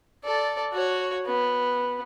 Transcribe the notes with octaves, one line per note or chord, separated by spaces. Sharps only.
A4 D5
F#4 C#5
B3